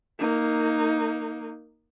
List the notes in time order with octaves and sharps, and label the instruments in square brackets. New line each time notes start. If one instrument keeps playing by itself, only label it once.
[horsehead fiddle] A#3 D#4